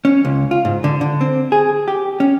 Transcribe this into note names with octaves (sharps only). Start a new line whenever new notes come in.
C#4
C#2
F4
G#2
D3
D3
C4
G#4
G4
C#4